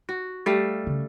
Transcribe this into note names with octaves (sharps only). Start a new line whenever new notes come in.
F#4
G3 A3 F5
C#3